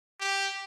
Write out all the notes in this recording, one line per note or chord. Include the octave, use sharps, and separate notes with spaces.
G4